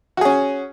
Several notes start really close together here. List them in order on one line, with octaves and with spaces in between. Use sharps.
F#4 G#4 C#4